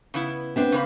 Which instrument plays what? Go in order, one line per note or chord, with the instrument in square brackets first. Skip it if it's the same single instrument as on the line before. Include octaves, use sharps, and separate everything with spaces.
[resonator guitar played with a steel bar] C#3 B3 E4
[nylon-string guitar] B3 C4 D4
[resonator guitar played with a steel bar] C#3 A#3 B4